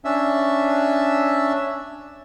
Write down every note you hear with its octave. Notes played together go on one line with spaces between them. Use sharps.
C#4 D4 E5